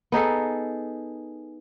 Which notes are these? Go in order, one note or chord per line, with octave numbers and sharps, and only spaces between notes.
B3 D#4 G#4 A4